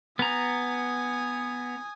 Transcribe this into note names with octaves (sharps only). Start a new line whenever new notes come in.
B3 G#5 A#5 D#6